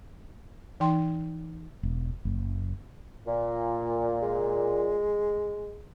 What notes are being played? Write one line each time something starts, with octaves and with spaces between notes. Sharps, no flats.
E3 D#4 G5 C6
E1
F#1
A#2
G#3